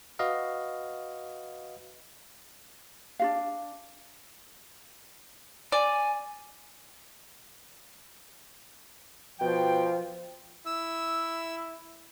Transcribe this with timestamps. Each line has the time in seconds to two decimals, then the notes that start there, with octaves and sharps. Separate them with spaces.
0.19 F#4 B4 D#5 F5
3.19 D4 F#4 F5
5.72 D5 G#5
9.40 B2 F3 G5
10.66 E4 E6